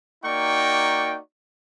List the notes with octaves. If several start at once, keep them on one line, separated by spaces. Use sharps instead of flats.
A#3 D#4 F#4 D5 G5 C#6